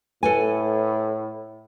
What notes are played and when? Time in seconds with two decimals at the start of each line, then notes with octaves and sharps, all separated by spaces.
0.23 A2 A4 B4 G#5